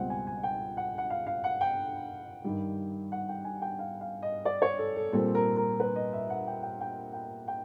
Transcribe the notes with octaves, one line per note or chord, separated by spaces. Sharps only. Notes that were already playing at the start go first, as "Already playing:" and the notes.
Already playing: C#2 B2 G3 C4 F#5 G5
G#5
G#5
G5
F#5
F#5
F5
F5
F#5
G5
G2 D#3 G3
F#5
G5
G#5
G5
F5
F5
D#5
D5
C#5
A4
A4
A#2 G3 C4 A4
A#4
A#4
B4
D#5
E5
F#5
G5
G5
G5
G5
G5